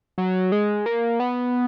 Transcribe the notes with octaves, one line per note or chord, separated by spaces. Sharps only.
F#3
G#3
A#3
B3